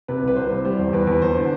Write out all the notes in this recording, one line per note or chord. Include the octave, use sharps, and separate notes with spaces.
C3 B4
C2
B4
C2 C5
C3
G3 C5
E2
E2 B4
E2
E2 C5
D3